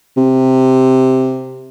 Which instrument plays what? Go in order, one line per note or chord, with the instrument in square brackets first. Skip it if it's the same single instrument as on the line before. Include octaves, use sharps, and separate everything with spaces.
[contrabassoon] C3